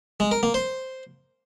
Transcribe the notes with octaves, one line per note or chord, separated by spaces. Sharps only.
G#3
A#4
A#3
C5